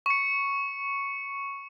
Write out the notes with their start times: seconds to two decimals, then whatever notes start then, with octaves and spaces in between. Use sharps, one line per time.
0.06 C#6 C#7